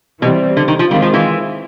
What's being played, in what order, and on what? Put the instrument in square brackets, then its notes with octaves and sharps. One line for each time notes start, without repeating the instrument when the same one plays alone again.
[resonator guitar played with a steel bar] B2 [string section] E3 G3 C4
[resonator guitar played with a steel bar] D3
D#3
F3
[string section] D#3 G#3 C4 F4 [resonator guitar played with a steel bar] G3
[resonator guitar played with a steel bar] F3
E3